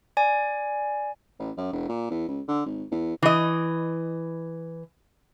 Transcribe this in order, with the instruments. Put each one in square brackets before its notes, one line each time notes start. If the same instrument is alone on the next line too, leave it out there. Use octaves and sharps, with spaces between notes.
[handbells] D5 G#5
[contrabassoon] A1
F#2
E1
A#2
E2
C#2
D3
G#1
E2
[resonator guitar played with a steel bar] E3 D#5